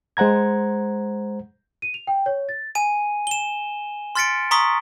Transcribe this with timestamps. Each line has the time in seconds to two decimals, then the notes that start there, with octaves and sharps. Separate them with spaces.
0.17 G#3 C5 F#5 A#5 G#6
1.82 D#7
1.94 F7
2.07 G5
2.26 C#5
2.49 A6
2.75 G#5 D#7
3.27 E7 G7
4.15 C6 F6 A6 B6 C#7 D7
4.51 A#5 C6 C#6 D#6 B6